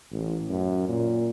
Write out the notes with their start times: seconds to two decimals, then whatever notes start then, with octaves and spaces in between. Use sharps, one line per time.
0.12 A1
0.50 F#2
0.89 A#2